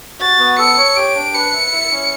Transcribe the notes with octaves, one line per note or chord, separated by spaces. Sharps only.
F#4 A6
B3
A4 C#7
C#5
G4 D7
D4
B4 C#7
E5
E4
C#4